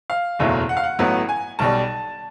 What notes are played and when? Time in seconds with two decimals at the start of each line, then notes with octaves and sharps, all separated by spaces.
0.10 F5
0.39 F#1 E2 B2 F#3 A3
0.69 F#5
0.77 F5
0.84 F#5
0.99 A1 A2 F#3 B3
1.29 G#5
1.59 B1 B2 G3 A5